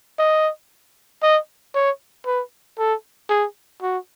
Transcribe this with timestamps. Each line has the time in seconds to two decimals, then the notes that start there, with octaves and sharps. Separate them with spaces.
0.19 D#5
1.23 D#5
1.75 C#5
2.26 B4
2.78 A4
3.30 G#4
3.82 F#4